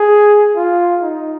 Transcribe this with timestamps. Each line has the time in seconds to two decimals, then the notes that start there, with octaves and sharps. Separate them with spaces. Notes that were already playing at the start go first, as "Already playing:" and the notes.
Already playing: G#4
0.56 F4
1.03 D#4